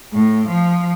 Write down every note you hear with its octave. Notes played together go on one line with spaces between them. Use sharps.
A2
F3